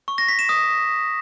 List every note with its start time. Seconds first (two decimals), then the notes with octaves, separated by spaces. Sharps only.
0.08 C#6
0.18 A#6
0.28 B6
0.39 E7
0.49 D#6